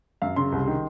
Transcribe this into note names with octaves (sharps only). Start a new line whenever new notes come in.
F#2 F5
C#3 C6
C2
D#3